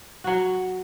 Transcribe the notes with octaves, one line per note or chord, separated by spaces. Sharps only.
F#3 F#4